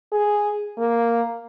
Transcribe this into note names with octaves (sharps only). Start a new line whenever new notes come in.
G#4
A#3